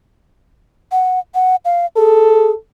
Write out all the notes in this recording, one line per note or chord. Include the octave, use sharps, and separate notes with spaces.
F#5
F#5
F5
G#4 A4